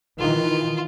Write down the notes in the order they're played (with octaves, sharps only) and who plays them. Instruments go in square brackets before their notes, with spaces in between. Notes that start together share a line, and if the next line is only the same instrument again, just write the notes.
[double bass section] D#3 E3 [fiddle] F4